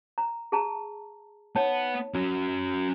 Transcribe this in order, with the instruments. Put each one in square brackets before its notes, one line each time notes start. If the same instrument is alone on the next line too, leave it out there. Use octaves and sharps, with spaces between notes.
[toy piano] A#5
G#4 A5 A#5
[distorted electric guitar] B3 F#5 [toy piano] D#4 C#5 A5
[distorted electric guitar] C#4 F#4